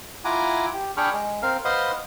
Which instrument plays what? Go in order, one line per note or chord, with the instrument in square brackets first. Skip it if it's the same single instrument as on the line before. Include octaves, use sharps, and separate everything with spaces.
[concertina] E4 F4 F#5 G#5 A#5 D6
G4
D4 G#4 G5 B5 C#6 F6
G#3
C4 A#4 F5
B4 C5 D#5 F5 F#5 C6